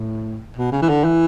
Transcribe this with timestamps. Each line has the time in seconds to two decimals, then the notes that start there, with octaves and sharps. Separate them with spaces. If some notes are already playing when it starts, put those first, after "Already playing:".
Already playing: A2
0.56 B2
0.72 C#3
0.82 E3
0.89 D3
1.04 E3